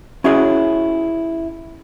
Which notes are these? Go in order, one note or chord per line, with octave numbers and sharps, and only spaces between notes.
C#4 E4 F#4 G#4 C#5